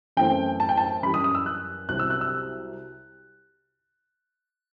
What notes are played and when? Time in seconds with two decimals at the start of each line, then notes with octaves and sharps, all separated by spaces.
0.17 F#2 E3 A3 C4 G5
0.60 A5
0.69 G5
0.77 A5
1.03 F#2 E3 G3 B5
1.14 D#6
1.24 D#6
1.35 E6
1.46 F#6
1.89 C2 C3 F#3 C4 F#6
1.99 E6
2.10 F#6
2.21 E6